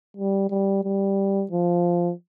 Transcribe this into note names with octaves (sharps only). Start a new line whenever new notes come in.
G3
G3
G3
F3